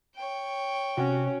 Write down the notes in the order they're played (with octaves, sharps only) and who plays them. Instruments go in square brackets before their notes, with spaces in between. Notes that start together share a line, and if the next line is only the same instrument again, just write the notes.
[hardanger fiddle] C#5 G5
[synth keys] C3 F#4 [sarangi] C#4